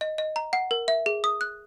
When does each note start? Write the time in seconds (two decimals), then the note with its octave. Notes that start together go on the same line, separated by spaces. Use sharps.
0.01 D#5
0.18 D#5
0.36 A#5
0.53 F#5
0.71 A#4
0.88 E5
1.06 G#4
1.24 D#6
1.41 F#6